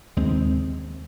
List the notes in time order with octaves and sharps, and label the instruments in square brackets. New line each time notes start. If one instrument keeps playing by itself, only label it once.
[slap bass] D#2 C#3 G#3 C4